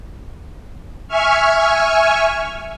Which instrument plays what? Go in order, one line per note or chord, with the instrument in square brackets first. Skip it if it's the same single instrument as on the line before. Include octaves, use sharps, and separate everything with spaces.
[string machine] E5 G#5 C#6 F6